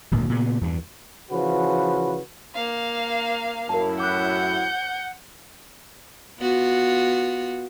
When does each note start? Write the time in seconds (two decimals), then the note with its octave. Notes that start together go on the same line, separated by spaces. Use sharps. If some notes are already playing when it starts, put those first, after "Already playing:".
0.11 D1 G#1 D2 A#2
0.30 A#2 C#3 B3
0.61 E2 G2
1.30 C#3 E3 F3 F#4 B4
2.55 A#3 F5
3.69 F#2 A2 E4 A#4 A5
4.00 F#5 D6 F#6 G6
6.40 B3 F4 F#4